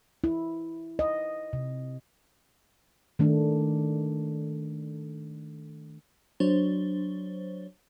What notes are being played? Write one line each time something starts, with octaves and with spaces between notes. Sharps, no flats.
E4
D#5
C3
D#3 A3 D4
F#3 D4 C5 C#5